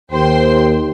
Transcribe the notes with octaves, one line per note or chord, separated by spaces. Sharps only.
D#2 C5 G5 C6